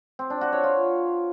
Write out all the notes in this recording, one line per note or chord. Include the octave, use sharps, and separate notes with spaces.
C4
D4
F#4
C#5
F4